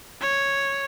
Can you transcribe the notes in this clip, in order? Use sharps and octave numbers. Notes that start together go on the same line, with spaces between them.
C#5